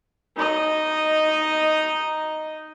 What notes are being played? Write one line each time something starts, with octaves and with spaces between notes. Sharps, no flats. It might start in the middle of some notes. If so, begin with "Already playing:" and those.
D#4 D#5